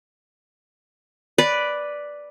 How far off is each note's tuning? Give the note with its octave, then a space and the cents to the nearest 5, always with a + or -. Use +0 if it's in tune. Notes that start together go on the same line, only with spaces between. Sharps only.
B4 +0 D5 +0